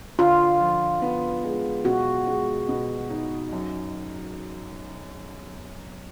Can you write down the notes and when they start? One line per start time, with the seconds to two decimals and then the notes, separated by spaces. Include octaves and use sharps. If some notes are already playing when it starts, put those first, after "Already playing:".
0.19 D3 F4
0.60 F3
1.02 B3
1.44 G#3
1.85 B2 F#4
2.27 G#3
2.69 B2
3.10 D#4
3.53 F#2